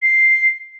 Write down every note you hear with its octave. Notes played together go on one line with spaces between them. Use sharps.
C7